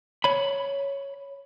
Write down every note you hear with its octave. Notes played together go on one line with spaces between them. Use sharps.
C#5 B5